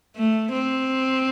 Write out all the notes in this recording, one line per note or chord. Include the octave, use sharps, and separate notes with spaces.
A3
C4